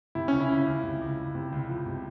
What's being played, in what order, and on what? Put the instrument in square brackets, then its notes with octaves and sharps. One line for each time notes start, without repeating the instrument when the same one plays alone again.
[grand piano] C3 [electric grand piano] E4
[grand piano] C#2 [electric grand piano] C#4
[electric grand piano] E4
[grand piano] C#2
C#2
C3
C#2
C#2
C3
C#2
F3
C3